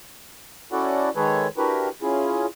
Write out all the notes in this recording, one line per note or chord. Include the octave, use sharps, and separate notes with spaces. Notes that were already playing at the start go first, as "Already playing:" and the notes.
C#4 E4 F#4 A4 D5 F#5
D#3 G#3 G#4 A4 B4 C#5
D4 E4 F#4 G4 A#4 B4
C#4 E4 F4 G#4